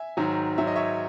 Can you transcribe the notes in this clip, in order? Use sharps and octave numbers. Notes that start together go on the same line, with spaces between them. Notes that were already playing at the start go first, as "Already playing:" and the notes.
Already playing: E5 G#5
G#2 D#3 F#3
G#2 D#3 F#3 E5
D#5
C#5 E5